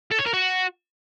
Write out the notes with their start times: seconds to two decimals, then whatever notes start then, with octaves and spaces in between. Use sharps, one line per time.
0.11 A4
0.19 C#5
0.26 A#4
0.33 F#4